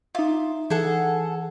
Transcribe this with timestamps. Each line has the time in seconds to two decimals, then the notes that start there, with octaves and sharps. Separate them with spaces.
0.15 D#4 F4 E5
0.70 E3 G#4 A4 F#5